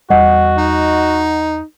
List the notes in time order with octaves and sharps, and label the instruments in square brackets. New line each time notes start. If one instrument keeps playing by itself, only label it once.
[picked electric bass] E2 G3 [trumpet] F#4 [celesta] D#5 F#5
[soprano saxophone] D#4